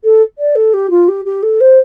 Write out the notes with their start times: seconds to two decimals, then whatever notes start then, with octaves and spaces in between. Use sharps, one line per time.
0.04 A4
0.38 D5
0.56 A4
0.74 G4
0.90 F4
1.08 G4
1.25 G4
1.43 A4
1.61 C5